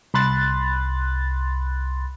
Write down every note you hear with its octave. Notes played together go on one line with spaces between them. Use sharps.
C2 B5 C6 F#6 A6